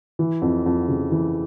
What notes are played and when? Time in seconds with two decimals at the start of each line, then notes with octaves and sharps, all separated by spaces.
0.19 E3
0.42 F2
0.66 F2
0.88 C#3
1.11 E3